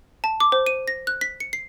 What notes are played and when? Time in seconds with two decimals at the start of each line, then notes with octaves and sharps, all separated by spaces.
0.24 A5
0.40 D6
0.52 C5
0.66 D#7
0.88 A#6
1.07 F#6
1.21 B6
1.40 C#7
1.53 C7